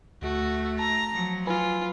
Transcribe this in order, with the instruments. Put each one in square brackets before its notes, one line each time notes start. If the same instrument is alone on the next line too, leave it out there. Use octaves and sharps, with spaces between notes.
[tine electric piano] D2 [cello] A3 [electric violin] F#4
[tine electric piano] A5 [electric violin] A#5
[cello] F3 F#3
[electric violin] F4 [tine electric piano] B4 G#5 B5